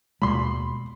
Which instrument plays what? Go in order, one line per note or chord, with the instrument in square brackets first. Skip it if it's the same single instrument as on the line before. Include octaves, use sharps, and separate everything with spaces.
[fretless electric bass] D#2 B2 G#3 [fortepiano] B5 C6